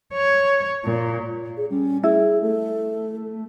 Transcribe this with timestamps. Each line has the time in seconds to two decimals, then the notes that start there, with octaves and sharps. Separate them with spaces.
0.14 C#5
0.85 A#2
1.57 G#4
1.70 G3 C#4
2.03 E4 G#4
2.42 A3 A4